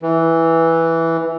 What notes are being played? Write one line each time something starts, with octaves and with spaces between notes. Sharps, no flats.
E3